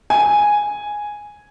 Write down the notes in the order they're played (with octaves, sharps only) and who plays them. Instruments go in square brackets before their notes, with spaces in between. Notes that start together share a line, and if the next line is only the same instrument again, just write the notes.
[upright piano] G#5